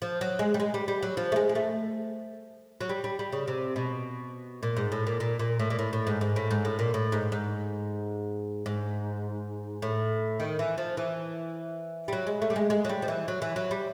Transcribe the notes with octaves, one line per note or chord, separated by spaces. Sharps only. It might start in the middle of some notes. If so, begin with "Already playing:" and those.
F3
F#3
G#3
G3
G#3
G3
G3
F#3
F3
A3
G#3
G#3
A3
F#3
G3
G3
G3
C#3
C3
B2
A#2
G#2
A2
A#2
A#2
A#2
A2
A#2
A2
A2
G#2
G#2
A2
G#2
A2
A#2
A2
G#2
G#2
G#2
A2
D#3
E3
F3
E3
G3
F#3
G#3
A3
G3
G#3
G#3
F#3
G3
F3
E3
F#3
E3
F#3
G3